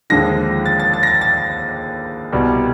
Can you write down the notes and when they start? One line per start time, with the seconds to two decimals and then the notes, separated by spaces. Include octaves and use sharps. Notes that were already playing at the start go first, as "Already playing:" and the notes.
0.10 D#2 D3 F3 G#3 A#6
0.66 A6
0.80 A6
0.93 A6
1.03 A#6
1.07 A6
1.21 A6
2.32 C2 B2 G3